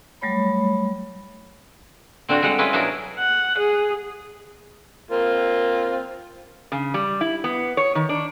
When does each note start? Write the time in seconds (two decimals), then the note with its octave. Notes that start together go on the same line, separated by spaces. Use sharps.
0.21 F#3 G3 A3 C#5 B5
2.29 D3 C4 D4 F4 F#4
2.42 D3 G3 G#3 F#5
2.59 C#4 E4 F4 B4 D#5
2.73 B2 F#3 D4 E4 G#4 A#4
3.19 F#5
3.58 G#4
5.11 A#3 C4 F4
6.72 C#3
6.94 G3
7.21 E4
7.44 B3
7.77 C#5
7.95 D#3
8.09 D4